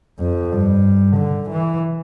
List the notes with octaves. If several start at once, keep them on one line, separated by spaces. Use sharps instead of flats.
F2
G2
D3
E3